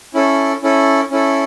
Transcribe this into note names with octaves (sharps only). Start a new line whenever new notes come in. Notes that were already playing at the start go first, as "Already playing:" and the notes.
C#4 E4 A4
C#4 E4 A4
C#4 E4 A4